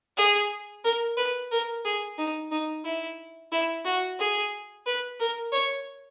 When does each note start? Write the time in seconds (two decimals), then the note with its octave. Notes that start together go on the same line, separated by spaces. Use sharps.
0.17 G#4
0.84 A#4
1.17 B4
1.51 A#4
1.84 G#4
2.18 D#4
2.52 D#4
2.85 E4
3.52 E4
3.85 F#4
4.19 G#4
4.86 B4
5.20 A#4
5.53 C#5